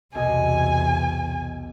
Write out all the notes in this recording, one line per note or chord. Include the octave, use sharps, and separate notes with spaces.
B1 E2 C3 D#5 G#5 G#6